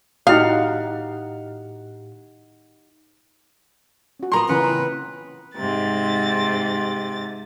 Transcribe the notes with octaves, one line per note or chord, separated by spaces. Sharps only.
A2 D#4 E4 F#4 G4 F5 F#5 D#6
C#4 F#4
A#2 A#3 B3 A#5 C6
C#3 E3 C#4 B4 F#5
C4
G#2 C3 A6